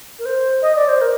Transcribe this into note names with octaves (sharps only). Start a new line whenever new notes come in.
A#4
C5
D#5
D5
C5
A#4